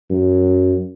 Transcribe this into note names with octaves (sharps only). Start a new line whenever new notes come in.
F#2